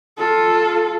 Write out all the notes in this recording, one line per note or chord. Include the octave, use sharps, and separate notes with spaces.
F4 A4